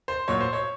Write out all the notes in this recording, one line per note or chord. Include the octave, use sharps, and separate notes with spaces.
C5
A#2 F#3 C#5
C5
C#5